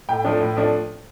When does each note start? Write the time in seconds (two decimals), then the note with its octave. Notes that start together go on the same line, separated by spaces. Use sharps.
0.09 A2 G5
0.25 F3 A3 D4
0.40 A2
0.57 F3 A3 D4